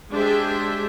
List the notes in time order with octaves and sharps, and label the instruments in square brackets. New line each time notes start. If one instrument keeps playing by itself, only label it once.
[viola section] G#3 D4 G4 G#4 C5 E5